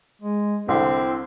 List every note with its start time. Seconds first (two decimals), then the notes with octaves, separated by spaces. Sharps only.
0.22 G#3
0.68 C2 D3 C4 E4